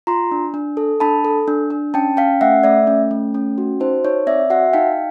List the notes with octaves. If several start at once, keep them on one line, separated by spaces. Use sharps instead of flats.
F4 A#5 C6
D4
D4
A4
D4 A5 B5
A4
D4
D4
C#4 G5 A5
C#4 F5 G5
A3 E5 F#5
A3 D5 E5
C#4
A3
C#4
F#4
D#4 C5
D#4 C#5
C4 D5 E5
F#4 E5 F#5
D#4 F5 G5